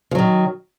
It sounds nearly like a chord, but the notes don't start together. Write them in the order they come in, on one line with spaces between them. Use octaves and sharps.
F3 F#3 D#3